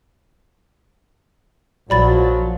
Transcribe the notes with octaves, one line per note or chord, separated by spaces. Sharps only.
A#1 F3 F#3 D5 B5 A6